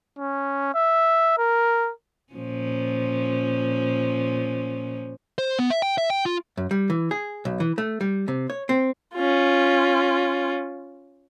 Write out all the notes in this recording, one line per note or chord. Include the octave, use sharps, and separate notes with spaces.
C#4
E5
A#4
A#2 F3 C#4
C5
B3
E5
G5
E5
G5
F4
F#2
G3
E3
G#4
B1
E3
A3
G3
C3
C#5
C4
C#4 F4